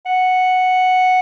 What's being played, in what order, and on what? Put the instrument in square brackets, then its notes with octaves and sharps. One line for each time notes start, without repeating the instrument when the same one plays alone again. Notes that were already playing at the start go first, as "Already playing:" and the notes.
[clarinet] F#5